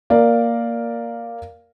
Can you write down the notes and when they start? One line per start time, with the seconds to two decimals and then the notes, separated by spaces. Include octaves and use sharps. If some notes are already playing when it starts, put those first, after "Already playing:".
0.10 A#3 A#4 D5 F5